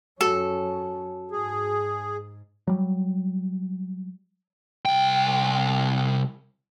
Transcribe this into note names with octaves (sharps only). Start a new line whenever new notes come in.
F#2 C#4 F#4 A4
G#2 G#4
F#3 G3
C2 G5